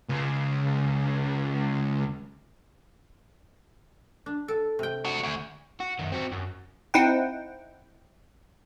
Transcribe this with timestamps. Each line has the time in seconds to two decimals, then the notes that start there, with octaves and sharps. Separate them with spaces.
0.10 C#2 C#3
4.26 D4
4.48 A4
4.79 C3 G5
5.05 D4 F#4
5.23 D2
5.80 F#4
5.99 F#2 D#3
6.12 C4 F#4
6.32 F#2
6.94 C4 D#4 E4 F#5 G5